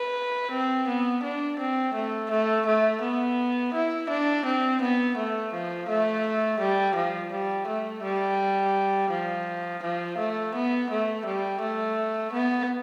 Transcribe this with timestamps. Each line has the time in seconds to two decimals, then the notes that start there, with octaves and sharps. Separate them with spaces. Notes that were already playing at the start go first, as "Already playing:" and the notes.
Already playing: B4
0.51 C4
0.87 B3
1.23 D4
1.59 C4
1.94 A3
2.31 A3
2.66 A3
3.01 B3
3.74 E4
4.09 D4
4.45 C4
4.81 B3
5.17 A3
5.53 F3
5.89 A3
6.60 G3
6.96 F3
7.32 G3
7.67 A3
8.03 G3
9.11 F3
9.83 F3
10.18 A3
10.54 B3
10.90 A3
11.25 G3
11.61 A3
12.33 B3